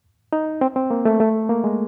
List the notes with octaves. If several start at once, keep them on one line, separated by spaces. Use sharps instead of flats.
D#4
C4
C4
A#3
A3
A3
A#3
G#3